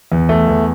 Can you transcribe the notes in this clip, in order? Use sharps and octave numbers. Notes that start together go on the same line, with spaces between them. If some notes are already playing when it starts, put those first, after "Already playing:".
E2
A3
E2